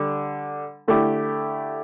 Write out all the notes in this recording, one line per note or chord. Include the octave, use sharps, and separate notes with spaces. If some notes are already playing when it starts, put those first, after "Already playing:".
Already playing: D3 G3
D3 A3 E4 G4